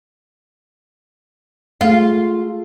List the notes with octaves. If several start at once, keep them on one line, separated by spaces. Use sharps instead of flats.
G#3 A3 F4 A4 F5